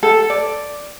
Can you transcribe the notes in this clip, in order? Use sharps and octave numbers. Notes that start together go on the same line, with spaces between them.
A4
D5